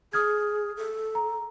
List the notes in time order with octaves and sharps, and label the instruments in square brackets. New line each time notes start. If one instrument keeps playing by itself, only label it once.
[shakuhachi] G#4 [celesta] D#6 F6 G#6
[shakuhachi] A4
[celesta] A#5